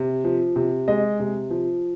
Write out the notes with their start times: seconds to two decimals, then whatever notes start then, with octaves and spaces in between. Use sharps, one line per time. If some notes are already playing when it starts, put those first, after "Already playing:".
Already playing: C3
0.24 F3
0.56 C3
0.88 G#3 D#5
1.19 C3
1.50 F3